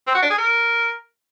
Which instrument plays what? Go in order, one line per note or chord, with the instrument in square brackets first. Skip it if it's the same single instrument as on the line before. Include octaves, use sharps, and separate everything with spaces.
[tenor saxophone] C4
F#4
D4
G#4
A#4